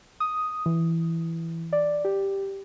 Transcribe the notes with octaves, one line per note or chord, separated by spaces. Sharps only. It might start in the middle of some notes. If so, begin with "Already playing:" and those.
D#6
E3
D5
G4